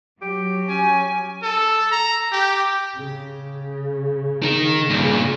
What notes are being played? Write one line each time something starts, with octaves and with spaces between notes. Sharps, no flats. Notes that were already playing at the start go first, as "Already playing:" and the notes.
F#3 G4
C#4 G#5
A4
A#5
G4
C#3
D#3 D#4
G2 A#2 C#3